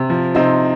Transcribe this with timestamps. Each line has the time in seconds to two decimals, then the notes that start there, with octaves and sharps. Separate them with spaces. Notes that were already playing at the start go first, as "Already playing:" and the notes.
Already playing: C3
0.10 F3
0.35 C3 C4 D#4